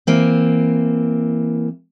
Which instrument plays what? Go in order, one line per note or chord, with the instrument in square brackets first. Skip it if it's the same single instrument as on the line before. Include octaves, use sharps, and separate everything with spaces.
[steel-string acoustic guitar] E3 A#3 C4